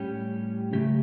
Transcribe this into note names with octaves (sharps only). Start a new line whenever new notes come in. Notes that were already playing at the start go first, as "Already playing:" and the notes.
Already playing: A2 G3 C#4 G4
C#3 F#3 A3 C#4 G4